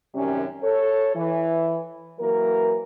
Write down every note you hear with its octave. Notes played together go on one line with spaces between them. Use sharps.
F#2 C3 D#3 G3 C#4
A4 C#5
E3
E3 F#3 A#3 A#4